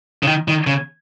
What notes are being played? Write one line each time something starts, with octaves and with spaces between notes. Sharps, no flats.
C#3
D#3
D#3
C#3